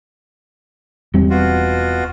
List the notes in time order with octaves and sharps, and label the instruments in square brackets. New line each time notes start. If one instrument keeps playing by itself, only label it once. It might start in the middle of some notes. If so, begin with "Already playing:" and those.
[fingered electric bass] E1 G3 C4
[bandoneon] B2 F4 F#4